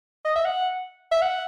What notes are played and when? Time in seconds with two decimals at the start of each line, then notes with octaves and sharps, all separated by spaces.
0.25 D#5
0.36 E5
0.45 F#5
1.12 E5
1.22 F#5